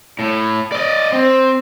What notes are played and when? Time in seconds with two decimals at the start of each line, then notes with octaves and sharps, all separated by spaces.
0.19 A2
0.72 D5 D#5
1.13 C4